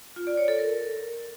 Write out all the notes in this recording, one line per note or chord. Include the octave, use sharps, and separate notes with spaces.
F4
D5
C#5
A4
A#4